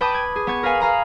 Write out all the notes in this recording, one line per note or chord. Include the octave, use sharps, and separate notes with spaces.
B4 G5 A5 B5 D6 D#6
G#6
G#4
B3 C#6 G#6
A#4 B4 F5 G#5 B5
G#4 F5 A#5 B5